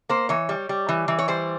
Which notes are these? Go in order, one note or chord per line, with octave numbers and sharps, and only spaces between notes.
A#3 C5
E3 C#5
G3
G3
E3
E3
C#5
G3 C5